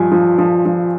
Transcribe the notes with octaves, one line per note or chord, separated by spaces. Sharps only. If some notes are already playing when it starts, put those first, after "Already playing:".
Already playing: G2 F3 G#5
F3
F3
F3